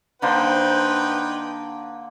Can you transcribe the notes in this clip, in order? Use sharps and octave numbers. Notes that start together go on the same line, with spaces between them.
D3 A#3 D#4 B4 C5 G5